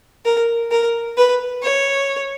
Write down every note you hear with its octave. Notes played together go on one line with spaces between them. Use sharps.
A#4
A#4
B4
C#5